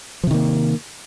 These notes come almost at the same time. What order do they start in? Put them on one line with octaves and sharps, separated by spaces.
F3 C3 D#3 A#3